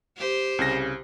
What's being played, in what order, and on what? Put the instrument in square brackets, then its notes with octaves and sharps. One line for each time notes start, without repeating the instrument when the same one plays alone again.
[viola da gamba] G4 C5
[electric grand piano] C2 C#3 A#6